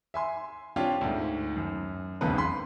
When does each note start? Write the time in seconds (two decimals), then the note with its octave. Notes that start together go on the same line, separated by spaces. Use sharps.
0.14 E5 G#5 C6
0.76 C4 D4 F4 G4 C#5
1.01 D2 G#2
1.56 F#2
2.21 E1 B1 F2 C#3 B3 B4
2.38 B5 C6 B6